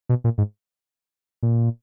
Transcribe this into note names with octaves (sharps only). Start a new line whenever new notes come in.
B2
A#2
G#2
A#2